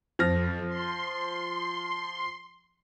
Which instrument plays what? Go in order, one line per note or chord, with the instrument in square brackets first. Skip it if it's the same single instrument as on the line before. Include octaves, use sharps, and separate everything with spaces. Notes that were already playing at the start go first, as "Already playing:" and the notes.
[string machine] F2 [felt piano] F3 F6 A#6
[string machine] C6